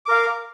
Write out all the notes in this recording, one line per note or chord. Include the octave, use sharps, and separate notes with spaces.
A#4 F5 D6